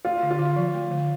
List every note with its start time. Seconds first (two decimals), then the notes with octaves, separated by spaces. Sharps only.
0.05 A3 F4
0.22 D3
0.31 F4
0.39 D3
0.56 F3
0.74 A3
0.91 D3